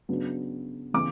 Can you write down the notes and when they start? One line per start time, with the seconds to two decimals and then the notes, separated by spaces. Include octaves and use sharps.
0.09 C#3 F#3 B3 D4
0.94 C#3 E3 B3 D6